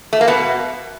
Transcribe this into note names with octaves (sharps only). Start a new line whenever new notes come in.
A3
A#3
B2 B3